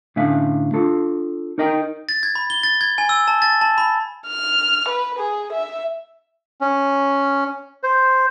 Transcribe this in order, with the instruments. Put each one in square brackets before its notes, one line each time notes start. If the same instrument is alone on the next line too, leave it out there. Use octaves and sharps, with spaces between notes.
[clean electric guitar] A2 D3 C#4 E5 F5
D4 F4 A4
D#4 A#4 D#5 G5
[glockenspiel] A6
G#6
B5
G7
A6
G#6
G#5
E6
A5
A6
A5
B5
[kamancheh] F6
B4
G#4
E5
[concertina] C#4
C5